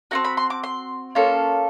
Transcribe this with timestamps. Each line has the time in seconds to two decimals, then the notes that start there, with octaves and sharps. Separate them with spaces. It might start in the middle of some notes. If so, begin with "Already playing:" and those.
0.11 C4 D#4 F#4 A#5
0.24 B5
0.37 C6
0.50 D6
0.63 C6
1.15 A#3 C#4 F4 A4